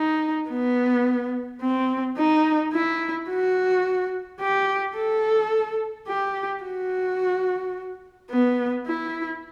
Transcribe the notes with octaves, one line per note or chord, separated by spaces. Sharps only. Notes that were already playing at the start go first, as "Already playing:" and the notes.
Already playing: D#4
B3
C4
D#4
E4
F#4
G4
A4
G4
F#4
B3
E4